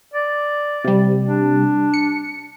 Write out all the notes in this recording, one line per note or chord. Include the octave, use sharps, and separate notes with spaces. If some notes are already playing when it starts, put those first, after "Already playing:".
D5
C3 G3
D4
C#7